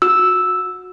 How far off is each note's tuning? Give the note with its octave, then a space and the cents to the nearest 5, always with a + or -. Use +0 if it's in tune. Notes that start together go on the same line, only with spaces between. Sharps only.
F#4 -25 E6 -5